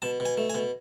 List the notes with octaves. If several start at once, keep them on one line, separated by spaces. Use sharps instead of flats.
B2 A5
B2
G#5
A3
G#5
B2